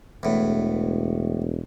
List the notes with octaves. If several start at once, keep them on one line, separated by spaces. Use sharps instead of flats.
E1 E2 A2